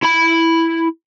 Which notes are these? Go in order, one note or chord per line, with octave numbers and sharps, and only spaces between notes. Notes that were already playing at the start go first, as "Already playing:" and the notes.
E4 B5